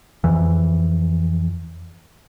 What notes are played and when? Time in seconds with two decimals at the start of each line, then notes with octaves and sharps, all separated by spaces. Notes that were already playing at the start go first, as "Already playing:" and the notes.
0.24 F2 E3